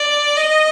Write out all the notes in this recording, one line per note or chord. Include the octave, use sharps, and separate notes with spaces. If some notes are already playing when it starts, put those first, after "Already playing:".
Already playing: D5
D#5